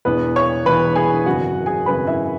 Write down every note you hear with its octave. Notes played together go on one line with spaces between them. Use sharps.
E1 E2 E3 B3 B4
C#5 C#6
E1 E2 E3 B4 B5
G#4 G#5
G#1 F#2 C#3 F#4 F#5
G#4 G#5
G#1 F#2 C#3 B4 B5
E4 E5